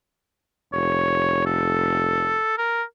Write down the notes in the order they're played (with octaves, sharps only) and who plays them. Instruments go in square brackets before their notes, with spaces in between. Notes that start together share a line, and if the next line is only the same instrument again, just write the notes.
[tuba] F1 [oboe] C#5
[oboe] A4
A#4